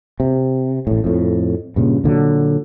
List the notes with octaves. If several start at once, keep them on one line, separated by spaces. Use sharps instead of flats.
C3
A1 A2
F2 A2
G2 A#2 C#3
A#2 D3 E3 F#3